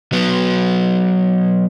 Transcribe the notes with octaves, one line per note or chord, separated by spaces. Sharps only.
F#3 B3